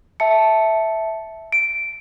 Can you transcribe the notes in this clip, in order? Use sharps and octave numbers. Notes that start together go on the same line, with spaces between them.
E5 A5 C#7
D7